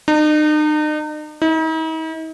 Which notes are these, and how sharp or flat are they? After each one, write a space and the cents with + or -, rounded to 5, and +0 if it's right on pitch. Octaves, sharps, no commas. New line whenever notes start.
D#4 -40
D#4 +45